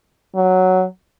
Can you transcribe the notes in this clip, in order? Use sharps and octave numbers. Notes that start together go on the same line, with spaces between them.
F#3